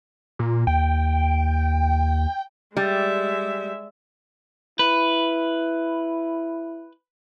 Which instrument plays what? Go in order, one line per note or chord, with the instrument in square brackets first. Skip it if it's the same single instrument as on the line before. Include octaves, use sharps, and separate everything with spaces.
[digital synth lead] A#2
[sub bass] D#2 [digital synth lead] G5
[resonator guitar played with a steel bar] G3 [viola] G#3 E5
[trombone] E4 [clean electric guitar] B4